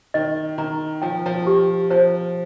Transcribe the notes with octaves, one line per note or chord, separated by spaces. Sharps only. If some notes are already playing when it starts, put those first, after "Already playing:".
D#3 D#5
D#3 A#5
F3 G5
F3
G4
F3 C5